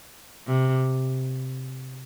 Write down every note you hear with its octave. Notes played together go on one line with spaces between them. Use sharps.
C3